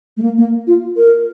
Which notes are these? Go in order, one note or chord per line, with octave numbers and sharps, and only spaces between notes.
A3
A#3
A#3
F4
A#4